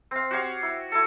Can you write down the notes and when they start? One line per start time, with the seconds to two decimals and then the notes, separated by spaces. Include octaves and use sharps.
0.11 C4 F5
0.31 F#4 G4 C#5 F5
0.63 E4
0.92 E4 A4